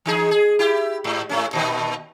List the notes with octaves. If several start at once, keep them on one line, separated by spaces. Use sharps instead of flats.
E3 D#4 G#4
G#4
E4 G4
G#2
G#2 A3 C#4
A#2 D#3 B3